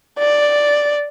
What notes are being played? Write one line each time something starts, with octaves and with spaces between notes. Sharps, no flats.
D5